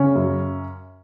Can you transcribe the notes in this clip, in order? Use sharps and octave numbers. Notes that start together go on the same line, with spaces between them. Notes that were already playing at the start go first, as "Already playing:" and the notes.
Already playing: C#3 C#4
F#2